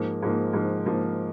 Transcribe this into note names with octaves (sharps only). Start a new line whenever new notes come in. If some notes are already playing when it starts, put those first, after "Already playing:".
Already playing: G#2 F3 A#3
G#2 F3 A#3
G#2 F3 A#3
G#2 F3 A#3